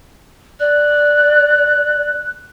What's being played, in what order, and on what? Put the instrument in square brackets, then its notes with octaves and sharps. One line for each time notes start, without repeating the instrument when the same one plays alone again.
[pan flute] D5 [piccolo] F#6